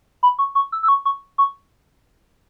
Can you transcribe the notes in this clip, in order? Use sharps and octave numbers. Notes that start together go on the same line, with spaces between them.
B5
C#6
C#6
E6
E6
C#6
C#6
C#6